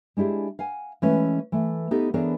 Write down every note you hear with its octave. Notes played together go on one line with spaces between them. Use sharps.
G#3 D4 E4 G4 G#4
F5 F#5 G#5
E3 G#3 A3 C#4 B4
E3 A3
B3 D#4 G4 A4
E3 B3 D4 G#4 A#4 C#5